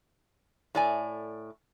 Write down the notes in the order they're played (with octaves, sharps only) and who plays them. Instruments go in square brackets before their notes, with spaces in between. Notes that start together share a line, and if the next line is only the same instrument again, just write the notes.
[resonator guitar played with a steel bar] A2 D5 G#5